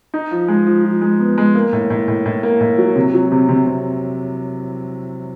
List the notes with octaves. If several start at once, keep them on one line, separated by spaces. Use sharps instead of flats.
D#4
F3
G#3
F3
F3
G#3
B3
G#3
A#3
A2
A2
A2
A2
A#3
A2
F#3
C3
F#3
C3
C3
C3